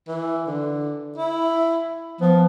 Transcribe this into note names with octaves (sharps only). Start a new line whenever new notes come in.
E3
D3
E4
F3 B3